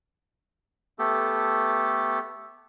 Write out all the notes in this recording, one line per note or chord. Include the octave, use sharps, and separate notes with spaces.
A3 B3 G4 A4